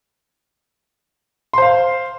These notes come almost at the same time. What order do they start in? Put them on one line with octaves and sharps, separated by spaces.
C6 C5 F5